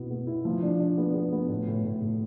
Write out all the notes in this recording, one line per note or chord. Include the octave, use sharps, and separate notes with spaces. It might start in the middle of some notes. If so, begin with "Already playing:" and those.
Already playing: B2 B3 E4
B3
E4
F3
D4
D4
B3
B3
B3
A2
A2
A2
A2